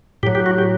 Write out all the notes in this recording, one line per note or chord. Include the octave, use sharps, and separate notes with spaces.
A2 F#3 G4
G4
F#4
G4